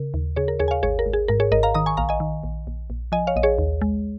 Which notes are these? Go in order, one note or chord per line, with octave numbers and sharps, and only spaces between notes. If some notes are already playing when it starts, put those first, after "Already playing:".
Already playing: C#3 A#4
D#2
C#3 G#4 C#5
A#4
D#2 G#4 C#5
G#5
C#5 F5
G#1 G#4 C#5
A#4
G#1
G#4
G#2 A#4
G#4 C#5
G#1 A#4 D#5
F5 A#5
D#3 A#5 D#6
G#5 C#6
A#1 F5 A#5
D#5 G#5
D#3
A#1
A#1
A#1
F3 D#5 G#5
C#5 F5
A#1 D#5
G#4 C#5
D#2
G#3